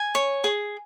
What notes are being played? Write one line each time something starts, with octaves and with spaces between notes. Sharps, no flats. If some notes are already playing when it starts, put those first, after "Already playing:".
Already playing: G#5
C#5
G#4